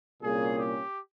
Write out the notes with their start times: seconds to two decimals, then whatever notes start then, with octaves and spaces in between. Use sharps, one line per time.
0.22 C2 A#2 G3 A#3 C#4 G#4
0.59 G4